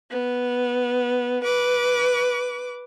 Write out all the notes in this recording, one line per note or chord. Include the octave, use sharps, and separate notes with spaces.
B3
B4 D6